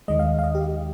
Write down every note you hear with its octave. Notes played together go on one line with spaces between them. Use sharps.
D#2 D#3 G#3 D#5
F5
F5
D#5
G4